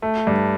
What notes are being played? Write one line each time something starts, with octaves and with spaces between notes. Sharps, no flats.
A3
G2